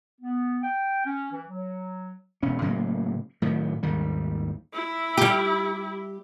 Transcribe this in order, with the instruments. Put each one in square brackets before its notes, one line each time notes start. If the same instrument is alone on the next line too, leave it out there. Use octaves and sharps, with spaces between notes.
[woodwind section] B3
G5
C#4
E3
F#3
[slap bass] E1 C#4
A2 C#3 F#3 A#3
A2 D#3 F#3
G#1 D#2 D#3 G3
[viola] E4
[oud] G3 G4